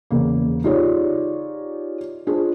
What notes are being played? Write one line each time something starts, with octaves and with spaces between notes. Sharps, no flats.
E2 C#3 A#3
D#4 F4 G4 G#4 C#5 D5
D4 F4 G#4 C5